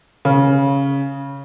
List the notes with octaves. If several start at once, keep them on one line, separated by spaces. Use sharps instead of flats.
C#3